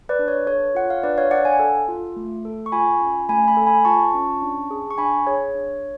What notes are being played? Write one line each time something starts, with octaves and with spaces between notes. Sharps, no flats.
B4 D5
D4
C#5
A4 C#5
F4 F#5
F5
D4 B4 D5
C#5 F5
D4 D5 F#5
F5 G#5
A4
F4
A3
A4
C#6
F4 G#5 B5
C#4
A3 G#5 B5
G#5 B5
A4
G#5 B5
F4 A5 C#6
C#4
D4
G#4
C#6
D4 G#5 B5
G#4 C#5
D4